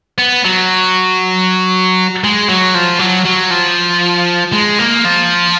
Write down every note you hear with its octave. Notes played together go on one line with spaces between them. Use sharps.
B3
F#3
G#3
F#3
F3
F#3
F#3
F3
G#3
A#3
F3